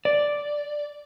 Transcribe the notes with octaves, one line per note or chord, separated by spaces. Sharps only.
D5